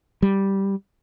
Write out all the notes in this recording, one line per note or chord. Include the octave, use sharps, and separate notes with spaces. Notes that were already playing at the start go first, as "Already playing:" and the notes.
G3